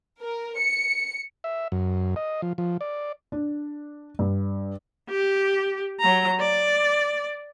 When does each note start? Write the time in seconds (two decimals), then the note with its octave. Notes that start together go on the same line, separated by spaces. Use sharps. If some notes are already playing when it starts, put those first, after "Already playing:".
0.21 A#4
0.59 C#7
1.44 E5
1.72 F#2
2.16 D#5
2.42 F3
2.58 F3
2.81 D5
3.32 D4
4.19 G2
5.09 G4
6.00 F#3 A#5
6.40 D5